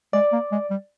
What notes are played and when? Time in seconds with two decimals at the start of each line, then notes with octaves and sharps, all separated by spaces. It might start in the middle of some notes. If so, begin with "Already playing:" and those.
0.13 G#3 D5
0.32 A#3
0.51 G#3
0.70 G3